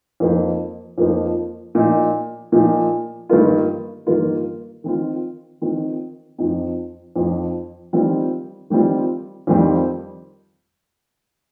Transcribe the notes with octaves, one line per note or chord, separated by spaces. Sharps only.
F2 F3 A#3 D#4
F2 F3 A#3 D#4
A#2 F3 D#4
A#2 F3 D#4
G2 D#3 A#3 F4
G2 D#3 A#3 F4
D#3 C4 F4
D#3 C4 F4
F2 F3 C4 D#4
F2 F3 C4 D#4
D#3 G3 C4 F4
D#3 G3 C4 F4
F2 D#3 G3 C4